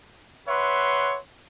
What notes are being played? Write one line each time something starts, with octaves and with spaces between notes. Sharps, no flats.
B4 C#5 E5 F#5 C6